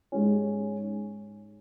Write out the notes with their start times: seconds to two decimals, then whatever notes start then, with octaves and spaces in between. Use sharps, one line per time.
0.12 G#2 G#3 C#4